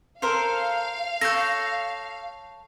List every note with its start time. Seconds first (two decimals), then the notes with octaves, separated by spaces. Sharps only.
0.22 A4 A#4 C5 F5
1.21 A4 C#5 G6 A#6